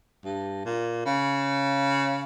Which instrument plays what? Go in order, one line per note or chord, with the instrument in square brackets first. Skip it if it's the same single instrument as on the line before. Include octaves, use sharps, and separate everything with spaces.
[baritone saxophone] G2
A#2
C#3